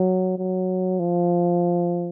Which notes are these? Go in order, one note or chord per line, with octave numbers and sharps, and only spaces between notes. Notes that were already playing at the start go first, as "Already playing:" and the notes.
Already playing: F#3
F#3
F3